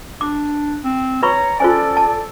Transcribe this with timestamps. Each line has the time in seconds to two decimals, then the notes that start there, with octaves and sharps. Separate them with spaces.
0.21 D4 D6
0.84 C4
1.23 B4 C#5 A#5 B5 C#6
1.60 C#4 F4 A4 C5 D5 G#5
1.97 A5